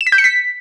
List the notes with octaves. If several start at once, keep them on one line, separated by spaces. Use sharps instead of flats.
E7
B6
G6
C#7
B6